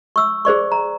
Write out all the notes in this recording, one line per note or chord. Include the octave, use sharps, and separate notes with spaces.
C#6 E6
G#4 C5 D5 C#6
A#5